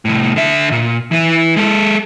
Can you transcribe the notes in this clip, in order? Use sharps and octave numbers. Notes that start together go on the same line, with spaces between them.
C2 A2
D3 E5
A#2
E3 E4
G#3 A4